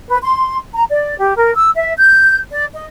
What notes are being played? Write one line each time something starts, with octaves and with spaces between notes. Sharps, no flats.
B4
C6
A#5
D5
G4
A#4
E6
E5
G6
D5
D#5